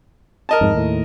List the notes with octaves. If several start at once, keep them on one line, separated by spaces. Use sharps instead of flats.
A#4 D#5 A5
F2 G#2
D#2 A2